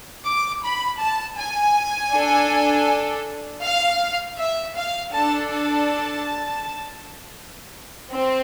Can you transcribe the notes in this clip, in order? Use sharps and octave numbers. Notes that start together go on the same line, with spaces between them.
D6
B5
A5
G#5
D4 A4
F5
E5
F5
D4 A4 A5
A5
C4